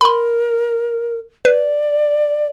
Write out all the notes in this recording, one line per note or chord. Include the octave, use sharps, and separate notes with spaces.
A#4 B5 C6
B4 D5